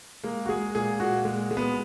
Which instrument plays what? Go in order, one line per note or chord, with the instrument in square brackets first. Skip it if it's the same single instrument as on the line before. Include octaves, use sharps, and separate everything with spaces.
[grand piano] G#3 A#3
F#4
G#3 G#4
A#2 G#4
A#2 F#4
G#3
G#3
B3